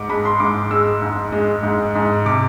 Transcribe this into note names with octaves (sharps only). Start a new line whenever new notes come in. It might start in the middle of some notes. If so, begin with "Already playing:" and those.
Already playing: G#2 D6
G#3 B5
C6
G#2 D6
G#3 E6
G#2
G#3
G#2
G#2
C3 D6